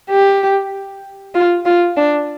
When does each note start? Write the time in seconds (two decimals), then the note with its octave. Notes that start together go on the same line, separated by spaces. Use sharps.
0.10 G4
1.35 F4
1.66 F4
1.97 D4